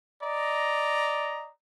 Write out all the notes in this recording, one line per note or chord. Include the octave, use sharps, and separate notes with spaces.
D5 D#5 A#5